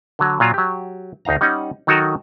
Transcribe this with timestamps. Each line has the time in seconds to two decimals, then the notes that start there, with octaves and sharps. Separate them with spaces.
0.19 D3 F#3
0.40 A#2 F#3 F4
0.54 F#3 G4
1.25 D2 D#4 F5 A#5
1.41 G3 C#4 D#4 F#5
1.87 D#3 F#3 D#4 F#4 A4 A#4